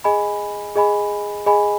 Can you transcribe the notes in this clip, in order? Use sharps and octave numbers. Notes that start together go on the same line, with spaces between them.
G#4 D#5 G#5 B5
G#4 D#5 G#5 B5
G#4 D#5 G#5 B5